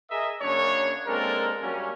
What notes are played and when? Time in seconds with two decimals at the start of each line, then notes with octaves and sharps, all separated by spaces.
0.10 G#4 A#4 D#5 E5
0.41 F#2 C#3 A#3 D4 C#5
1.07 G#3 A#3 C4 D4 A4 A#4
1.61 F#2 F#3 G3 A#3 C#4